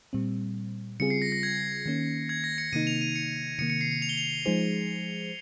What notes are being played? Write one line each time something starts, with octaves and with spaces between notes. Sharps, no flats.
A#2 G3 C4
C#3 G3 C4 F4 G#4 C#7
C7
A#6
A#6
G#6
D#3 A#3 C#4
G#6
A#6
C#7
C3 D#3 A#3 D#4 D#7
F7
D#7
C#7
C3 D#3 A#3 C#7
C#7
C7
C#7
F7
G7
F7
F3 G#3 D#4 G#4 C5